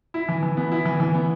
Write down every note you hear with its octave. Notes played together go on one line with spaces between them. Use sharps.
E4
E3
E3
B3
E4
E3
E3
B3